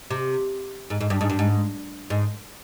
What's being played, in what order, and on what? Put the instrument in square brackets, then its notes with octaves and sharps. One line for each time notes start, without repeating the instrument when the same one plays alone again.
[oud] C3
G#2
G#2
G2
G#2
G2
G#2
G#2